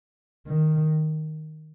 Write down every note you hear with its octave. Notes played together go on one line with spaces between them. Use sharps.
D#3